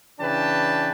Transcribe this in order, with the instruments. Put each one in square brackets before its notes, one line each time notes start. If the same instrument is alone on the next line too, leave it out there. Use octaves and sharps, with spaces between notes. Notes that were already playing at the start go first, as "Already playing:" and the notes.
[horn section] C#3 E3 D4 B4 G5 A5